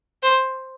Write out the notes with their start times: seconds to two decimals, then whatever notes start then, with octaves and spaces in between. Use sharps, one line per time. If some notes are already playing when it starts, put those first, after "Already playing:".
0.23 C5